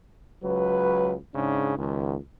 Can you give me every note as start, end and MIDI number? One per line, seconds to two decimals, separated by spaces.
0.43 1.15 37
0.43 1.15 54
0.43 1.15 71
1.35 1.75 44
1.35 1.75 49
1.35 1.75 62
1.35 1.75 63
1.77 2.17 37
1.77 2.17 51